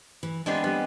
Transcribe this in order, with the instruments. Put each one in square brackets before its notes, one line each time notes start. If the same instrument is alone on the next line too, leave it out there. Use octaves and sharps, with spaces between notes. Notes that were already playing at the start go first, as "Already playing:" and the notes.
[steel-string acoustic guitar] E3
[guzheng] G#3 C4 G4 [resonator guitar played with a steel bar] B3 D4 [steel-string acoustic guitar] E4
[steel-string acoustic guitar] G3 [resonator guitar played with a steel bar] B3